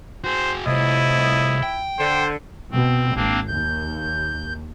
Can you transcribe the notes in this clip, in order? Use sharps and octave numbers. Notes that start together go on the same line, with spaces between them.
F#4 G#4 C5
C2 A2 F3 E4 D#5
G5
D3 C5
B2 C4
G#1 A#3 C4 D4
D#2 G6